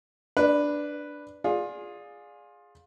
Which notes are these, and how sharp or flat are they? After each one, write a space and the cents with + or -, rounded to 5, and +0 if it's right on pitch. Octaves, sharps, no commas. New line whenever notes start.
D4 +0 B4 +0 D#5 -45
F4 +20 G#4 -5 D5 +0